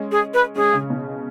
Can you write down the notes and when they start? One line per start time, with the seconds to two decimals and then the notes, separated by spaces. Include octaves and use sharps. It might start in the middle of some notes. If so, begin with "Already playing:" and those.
Already playing: G#3 C#4
0.11 G#4
0.34 B4
0.56 G#3 C#4 G#4
0.73 C#3
0.90 B2